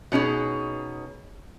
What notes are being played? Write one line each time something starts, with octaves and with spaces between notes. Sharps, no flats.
B2 C#4 D#4 G#4